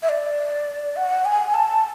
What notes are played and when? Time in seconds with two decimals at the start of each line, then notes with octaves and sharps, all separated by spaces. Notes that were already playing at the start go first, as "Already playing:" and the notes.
0.03 E5
0.09 D5
0.96 F#5
1.25 G#5
1.54 A5